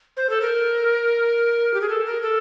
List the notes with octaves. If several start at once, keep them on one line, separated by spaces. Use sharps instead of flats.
C5
A4
A#4
G4
G#4
A4
A#4
A4